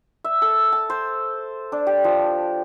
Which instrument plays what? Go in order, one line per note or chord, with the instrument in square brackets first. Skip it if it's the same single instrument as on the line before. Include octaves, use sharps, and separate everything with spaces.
[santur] E5
A4
A5
C5
D4
G4
F3